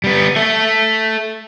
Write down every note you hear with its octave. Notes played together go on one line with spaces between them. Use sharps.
G3 B3
A4 E5